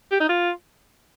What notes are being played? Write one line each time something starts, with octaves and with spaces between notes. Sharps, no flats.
G4
D#4
F4